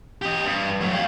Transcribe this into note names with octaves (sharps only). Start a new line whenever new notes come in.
G4 D#5
G2
F#3 A3
F5 G5